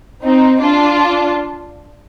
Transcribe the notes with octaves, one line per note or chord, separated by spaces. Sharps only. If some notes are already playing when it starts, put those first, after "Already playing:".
C4 D#4
D4 F4